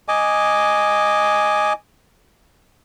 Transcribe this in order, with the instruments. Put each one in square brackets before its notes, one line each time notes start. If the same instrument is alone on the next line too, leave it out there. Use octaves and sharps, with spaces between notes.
[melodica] D#5 G#5 D6